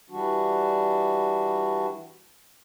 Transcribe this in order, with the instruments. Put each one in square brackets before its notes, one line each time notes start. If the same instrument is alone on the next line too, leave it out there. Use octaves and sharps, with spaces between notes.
[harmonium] E3 G3 D4 F#4